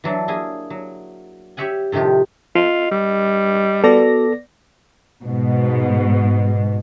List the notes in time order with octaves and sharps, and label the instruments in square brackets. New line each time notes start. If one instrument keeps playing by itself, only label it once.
[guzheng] E3 F#3 D4 E4
A#3 E4 G#4 G#5
F#3
G4 C#5 E5 F#5 G#5
A2 C3 D#3 F3 G4
[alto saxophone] F4 [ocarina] D#5
[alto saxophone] G3
[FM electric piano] B3 D5 A#6 [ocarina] F#4 [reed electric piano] A4
[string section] G#2 B2